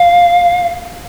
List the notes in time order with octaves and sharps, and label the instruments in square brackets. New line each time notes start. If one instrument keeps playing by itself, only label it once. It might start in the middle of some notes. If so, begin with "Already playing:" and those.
Already playing: [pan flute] F5